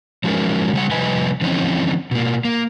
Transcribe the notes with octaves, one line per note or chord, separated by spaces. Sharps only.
F3 F#3 G#3 C#4 D#4 A#4
C#3 G3 F#5
C3 F3 G3 B4 D#5 G#5
D3 E3 F3 C4 C#4 D#4
B2 A#3
A#3